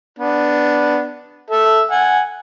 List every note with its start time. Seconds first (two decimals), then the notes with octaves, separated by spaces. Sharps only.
0.19 B3 D4
1.50 A4 E5
1.91 F#5 G#5